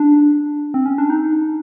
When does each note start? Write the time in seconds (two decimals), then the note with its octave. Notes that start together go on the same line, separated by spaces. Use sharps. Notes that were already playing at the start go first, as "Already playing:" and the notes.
Already playing: D4
0.74 C4
0.86 C#4
0.98 D4
1.10 D#4